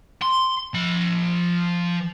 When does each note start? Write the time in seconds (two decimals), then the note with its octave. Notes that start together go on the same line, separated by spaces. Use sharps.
0.22 C6
0.74 F3 B5